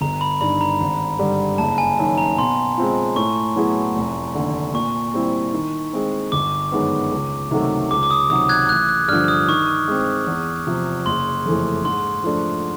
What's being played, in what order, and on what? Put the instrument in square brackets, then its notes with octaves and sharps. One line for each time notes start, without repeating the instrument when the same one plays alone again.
[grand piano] G1 [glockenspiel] A#5
[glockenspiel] B5
[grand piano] G2 D#3 [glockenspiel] B5
[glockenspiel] A#5
[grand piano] G#1
G2 D3 G3
[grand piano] F#1 [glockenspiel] A5
[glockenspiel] G#5
[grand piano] F#2 D#3
[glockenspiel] A#5
[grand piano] B2 [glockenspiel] C6
[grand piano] G#3 C4 F4
[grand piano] A2 [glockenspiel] C#6
[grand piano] F#3 B3 E4 G#4
F1
D#2 D3
[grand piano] A#2 [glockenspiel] C#6
[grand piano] G3 C4 E4
D#3
G#3 C4
[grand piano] G1 [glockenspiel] D6
[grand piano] F#2 D#3 G#3 B3
C#2
C3 D#3 F#3 A3
[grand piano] C#2 [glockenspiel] D6
[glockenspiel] D6
D#6
[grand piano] C3 D#3 F#3 [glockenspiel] D#6
[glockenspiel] F#6 G#6
[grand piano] A1 [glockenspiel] F#6
[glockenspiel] F#6
[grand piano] G2 D3 F3 [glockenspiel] F6
[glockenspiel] D#6
[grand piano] D#3 [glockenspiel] C#6
[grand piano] G#3 C4
E2
C3 F3
[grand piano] F#1 [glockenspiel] C6
[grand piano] F2 C#3 E3 A3
[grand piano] G#2 [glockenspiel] C6
[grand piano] F3 A3 D4